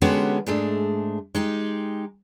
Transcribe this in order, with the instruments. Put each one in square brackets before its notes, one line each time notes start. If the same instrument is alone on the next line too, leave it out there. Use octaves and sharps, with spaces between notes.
[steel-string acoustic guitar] D3 G#3 B3 C#4 F#4 G4
G#2 G#3 A3 D4
G#3 D#4 G4